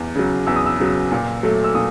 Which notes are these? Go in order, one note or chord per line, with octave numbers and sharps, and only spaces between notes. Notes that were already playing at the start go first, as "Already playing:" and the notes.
Already playing: E2
C#3 F#3
E2 E6
D#6
E6
C#3 F#3
A#2
F#3 A3
E6
A#2 D#6